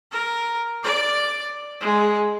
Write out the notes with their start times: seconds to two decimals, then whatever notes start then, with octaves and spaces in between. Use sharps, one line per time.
0.12 A#4
0.84 D5 D6
1.81 G#3